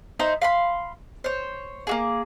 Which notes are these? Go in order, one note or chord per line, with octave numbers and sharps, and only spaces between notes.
D#4 E4 C5 G6
F5 B5 C6
C5 C#5
A#3 F#4 G#4